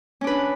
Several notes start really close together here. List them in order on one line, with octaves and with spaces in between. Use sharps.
C#4 D4 B4